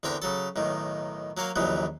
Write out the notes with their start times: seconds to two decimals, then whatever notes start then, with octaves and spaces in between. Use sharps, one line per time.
0.03 E2 D3 C4 A#4 G5
0.22 C#3 F#3 A4
0.56 B1 A2 D#3
1.37 F#3 A#3 C#5 F5
1.56 A#1 D#2 C#3 E3 F#3